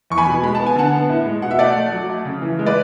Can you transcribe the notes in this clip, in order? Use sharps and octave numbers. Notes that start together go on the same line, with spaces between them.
E2 C#6
G#5 B5
B2
G#3 B5
A5
B3
G#5
D3 F#5 A5
B3
A2
G#3
B2 F#5
E5
A3 D5 F#5
A3
F#3
A3
C#3
E3
G#3
B4 D5